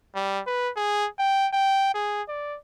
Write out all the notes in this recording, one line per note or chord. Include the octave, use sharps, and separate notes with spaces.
G3
B4
G#4
G5
G5
G#4
D5